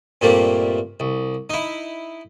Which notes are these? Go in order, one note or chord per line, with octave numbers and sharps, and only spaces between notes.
G2 A#2 G3 A3 A#3 C4
C2
D#4 E4